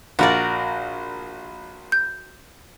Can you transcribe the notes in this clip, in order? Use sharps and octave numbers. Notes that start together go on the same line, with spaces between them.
A#1 F#4 A#4 D5
G6